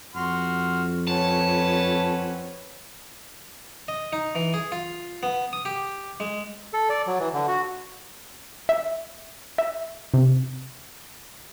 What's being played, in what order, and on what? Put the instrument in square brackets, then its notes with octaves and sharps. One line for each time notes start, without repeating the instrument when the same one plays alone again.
[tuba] F2 [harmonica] F#4 C6 F6
[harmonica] C4 C#4 F#5 [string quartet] B4 C#5 [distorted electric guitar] A5
[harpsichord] D#5
D#4
E3
G#4
F4
B3
D#6
G4
G#3
[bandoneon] A4
D5
F#3
E3
D3
F#4
[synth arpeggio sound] E5
E5
C3